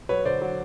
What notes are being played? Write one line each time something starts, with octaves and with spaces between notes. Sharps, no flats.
F#3 B4 C#5
D3 C5 D5
F#3